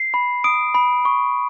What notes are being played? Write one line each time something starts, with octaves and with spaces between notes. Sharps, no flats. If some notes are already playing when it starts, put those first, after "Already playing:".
Already playing: C7
B5
D#6 D7
B5
C#6